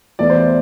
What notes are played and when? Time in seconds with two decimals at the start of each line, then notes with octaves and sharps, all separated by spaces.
0.19 E2 E3 A3 D5
0.30 C5